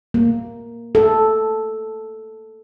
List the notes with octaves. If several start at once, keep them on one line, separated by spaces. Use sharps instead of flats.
A#3
A4